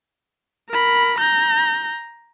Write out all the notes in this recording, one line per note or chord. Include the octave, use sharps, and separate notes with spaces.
A#4 B5
A#5 G6